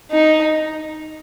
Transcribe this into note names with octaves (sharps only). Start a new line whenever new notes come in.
D#4